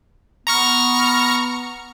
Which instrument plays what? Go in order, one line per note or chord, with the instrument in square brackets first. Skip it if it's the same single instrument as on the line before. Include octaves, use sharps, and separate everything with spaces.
[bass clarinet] B3 [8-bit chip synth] A#5 C#6 F6